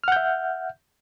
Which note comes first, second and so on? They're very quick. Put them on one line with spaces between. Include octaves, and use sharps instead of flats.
F6 F#5 G6 E5